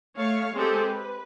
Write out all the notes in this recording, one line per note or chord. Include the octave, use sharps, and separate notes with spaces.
A3 C#5 F5
G#3 C4 G4 A4
B4